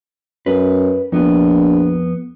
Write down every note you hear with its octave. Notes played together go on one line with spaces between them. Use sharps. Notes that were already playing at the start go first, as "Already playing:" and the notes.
F#2 B4
A#1 F2 B3